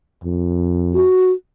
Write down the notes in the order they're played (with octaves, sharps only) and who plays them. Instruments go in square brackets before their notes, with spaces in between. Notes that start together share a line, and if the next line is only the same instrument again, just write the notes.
[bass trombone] F2
[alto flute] F#4